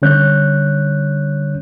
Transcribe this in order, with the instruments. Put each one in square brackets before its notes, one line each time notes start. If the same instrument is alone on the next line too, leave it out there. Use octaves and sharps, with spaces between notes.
[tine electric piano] D3 G3 C#4 C#5 F#6 G6